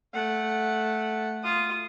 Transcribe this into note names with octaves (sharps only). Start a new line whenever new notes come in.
A3 F#5
F4 D#6